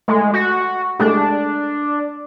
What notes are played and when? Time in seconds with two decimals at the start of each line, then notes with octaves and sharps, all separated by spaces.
0.08 G#3 A3
0.34 F#4
1.00 G#3 A3 D4 G4